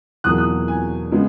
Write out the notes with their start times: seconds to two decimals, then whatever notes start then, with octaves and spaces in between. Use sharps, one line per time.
0.24 E2 B2 F#3 A#3 D#6 F#6
0.38 D#6 F#6
0.68 G#5
1.12 C#3 G#3 B3